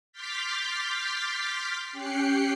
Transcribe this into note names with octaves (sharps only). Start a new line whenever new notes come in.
C6 D6 F6 G6 A6 B6
C#4 G4 G5 F#6 C7 C#7